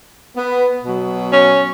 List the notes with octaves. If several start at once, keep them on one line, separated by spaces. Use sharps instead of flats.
B3
B2 F#3
C#4